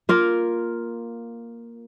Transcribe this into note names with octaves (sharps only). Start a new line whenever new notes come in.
A#3 F4 A#4